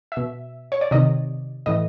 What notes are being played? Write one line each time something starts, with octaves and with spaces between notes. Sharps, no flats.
B2 E5
C#5
D5
C3 D#3 D#5
A2 E3 D#5